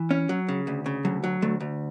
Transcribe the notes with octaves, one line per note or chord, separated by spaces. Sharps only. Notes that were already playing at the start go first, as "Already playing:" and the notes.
Already playing: E3
C#4
F#3
C#3
D2
C#3
D2 F#3
F#3
D2 A3
D2